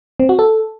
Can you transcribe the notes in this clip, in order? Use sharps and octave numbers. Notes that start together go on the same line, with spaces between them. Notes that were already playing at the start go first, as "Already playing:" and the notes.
C4
F#4
A4